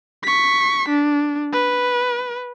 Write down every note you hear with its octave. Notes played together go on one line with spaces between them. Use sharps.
C#6 B6
D4
B4